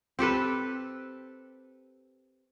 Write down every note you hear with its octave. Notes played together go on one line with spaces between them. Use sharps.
C4 G4 A4 B4